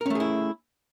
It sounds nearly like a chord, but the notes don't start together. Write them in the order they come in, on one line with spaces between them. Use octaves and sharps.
A#4 C#4 A3 G#4 E4